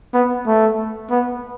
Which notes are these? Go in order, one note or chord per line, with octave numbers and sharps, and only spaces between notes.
B3
A3
B3